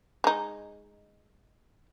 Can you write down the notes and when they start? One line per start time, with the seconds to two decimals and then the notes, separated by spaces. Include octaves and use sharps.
0.24 G#3 D#4